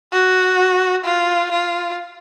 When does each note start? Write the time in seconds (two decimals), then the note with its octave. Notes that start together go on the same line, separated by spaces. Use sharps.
0.12 F#4
1.04 F4
1.51 F4